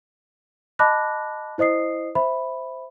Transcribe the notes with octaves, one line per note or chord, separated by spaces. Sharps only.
D#5 A5 B5 D6 F#6 A#6
E4 C5 D#5 D#6 C7
C5 E5 B5